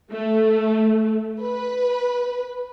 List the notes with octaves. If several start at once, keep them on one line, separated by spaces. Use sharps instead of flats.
A3
B4